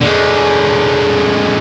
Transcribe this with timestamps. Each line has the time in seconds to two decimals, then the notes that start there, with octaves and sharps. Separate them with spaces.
0.01 D3 G#3